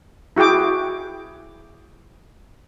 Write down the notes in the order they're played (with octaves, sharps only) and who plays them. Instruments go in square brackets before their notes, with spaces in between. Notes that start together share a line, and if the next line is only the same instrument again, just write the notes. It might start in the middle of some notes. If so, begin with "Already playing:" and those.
[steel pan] E4 F#4 G#4 G5 D6